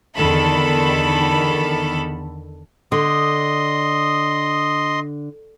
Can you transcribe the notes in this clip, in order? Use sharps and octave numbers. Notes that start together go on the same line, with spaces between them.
E2 D3 D#3 A4 B5
D3 D#5 C6 D#6